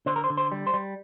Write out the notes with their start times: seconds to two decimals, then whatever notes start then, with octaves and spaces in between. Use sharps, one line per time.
0.06 D3 C5
0.16 A#4
0.24 C5
0.30 D3
0.37 C5
0.52 G3
0.67 C5
0.74 G3